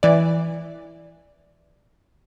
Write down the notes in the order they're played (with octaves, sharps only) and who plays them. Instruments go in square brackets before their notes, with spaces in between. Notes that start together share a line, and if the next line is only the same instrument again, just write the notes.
[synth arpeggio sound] E3 D5